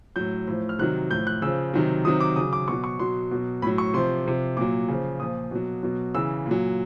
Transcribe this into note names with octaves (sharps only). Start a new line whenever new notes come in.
A2 F#3 G6
A2 F3
F6
C3 D#3 F#3 F#6
A2 F3 G6
F#6
C#3 F3 E6
C3 D#3 F#3
C3 D#3 F#3 D#6
D6
C#3 F#3 D#6
D6
B2 F#3 C#6
C#6
B2 F#3 C6
B2 F#3
A2 F#3 B5
C#6
C3 F3 C6
C3 F3
A#2 F#3 D6
C#3 F3
A#2 F3 D#6
B2 F#3
B2 F#3
C#3 E3 E6
A#2
F#3